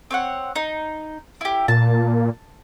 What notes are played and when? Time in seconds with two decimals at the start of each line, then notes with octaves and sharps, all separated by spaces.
0.11 C4 C#5 F#5
0.56 D#4
1.41 E4 G4
1.68 A#2 A5